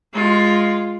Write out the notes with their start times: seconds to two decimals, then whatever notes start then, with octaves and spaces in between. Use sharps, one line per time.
0.15 G#3 F4